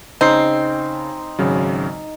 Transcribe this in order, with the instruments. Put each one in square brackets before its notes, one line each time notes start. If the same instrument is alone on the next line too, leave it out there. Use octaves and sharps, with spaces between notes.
[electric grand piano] C#3 C7 [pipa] C4 [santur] D#4
[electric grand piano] G#1 C#3 F#3